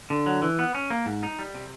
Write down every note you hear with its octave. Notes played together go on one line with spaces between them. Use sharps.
D3
F#3
E3
B3
C#4
A#3
G#2
D#4
G3
C3